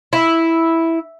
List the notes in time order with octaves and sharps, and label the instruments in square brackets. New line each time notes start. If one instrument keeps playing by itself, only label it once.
[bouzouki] E4